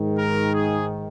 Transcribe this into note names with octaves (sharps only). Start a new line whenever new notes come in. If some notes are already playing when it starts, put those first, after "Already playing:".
Already playing: G#2 D#3
A#4
G#4